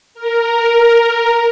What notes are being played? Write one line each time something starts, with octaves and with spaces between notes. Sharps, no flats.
A#4